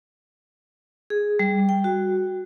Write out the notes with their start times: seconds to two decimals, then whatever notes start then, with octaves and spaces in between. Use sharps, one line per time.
1.10 G#4
1.39 G3
1.69 G5
1.84 F#4